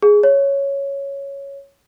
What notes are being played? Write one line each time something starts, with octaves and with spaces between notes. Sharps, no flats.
G#4
C#5